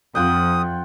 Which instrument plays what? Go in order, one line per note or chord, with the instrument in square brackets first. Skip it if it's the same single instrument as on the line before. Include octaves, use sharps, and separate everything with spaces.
[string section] F2 [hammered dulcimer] F4 F#5 G5 [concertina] D#6